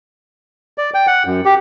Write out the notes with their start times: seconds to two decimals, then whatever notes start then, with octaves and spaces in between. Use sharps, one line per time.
0.78 D5
0.94 G5
1.07 F#5
1.26 F#2
1.45 G4